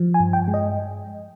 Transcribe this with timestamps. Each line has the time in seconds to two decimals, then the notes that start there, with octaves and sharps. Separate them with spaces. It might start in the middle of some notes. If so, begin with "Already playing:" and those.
Already playing: F3
0.14 G#5
0.20 G2
0.33 G5
0.48 G#3
0.54 D#5